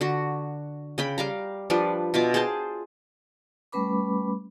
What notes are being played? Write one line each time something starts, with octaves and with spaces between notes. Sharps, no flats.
D3 F#4
C#3 G5 B5
G3 F5 A#5
F3 G3 D4 B4
B2 F4 E5 D6
G#4 C5 G5 A5
G3 A3 C#4 B4 B5 D6